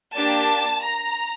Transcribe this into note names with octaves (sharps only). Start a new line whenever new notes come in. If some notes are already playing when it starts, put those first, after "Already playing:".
A#3 D4 G4 A5
A#5